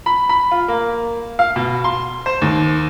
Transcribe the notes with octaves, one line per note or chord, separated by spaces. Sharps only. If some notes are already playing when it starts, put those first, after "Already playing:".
B5
B5
F4
A#3
F5
B2
C6
C5
D#2